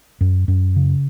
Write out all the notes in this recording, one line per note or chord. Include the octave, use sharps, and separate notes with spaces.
F#2
F#2
C#3